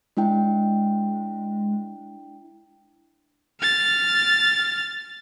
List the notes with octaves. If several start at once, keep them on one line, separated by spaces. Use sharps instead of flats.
G#3 D4 E4 G5
F6 A6